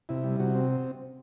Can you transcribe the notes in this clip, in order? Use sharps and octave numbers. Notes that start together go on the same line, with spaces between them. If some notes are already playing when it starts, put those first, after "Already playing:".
C3 E4
G3
C3 F#4
C4